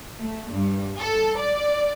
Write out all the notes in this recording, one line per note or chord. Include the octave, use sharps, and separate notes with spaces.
A3
G2
A4
D5